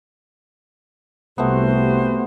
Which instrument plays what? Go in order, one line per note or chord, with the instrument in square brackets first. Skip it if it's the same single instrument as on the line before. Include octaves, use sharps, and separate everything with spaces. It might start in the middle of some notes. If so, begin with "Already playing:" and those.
[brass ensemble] C2 [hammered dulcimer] A3 B3 [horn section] F#4 G4 C5